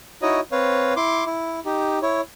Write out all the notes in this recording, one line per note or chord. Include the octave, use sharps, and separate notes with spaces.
D#4 E4 F#4 C#5 D#5
C4 B4 C#5 F5
E4 C6 D6
E4
D#4 G4
E4 C#5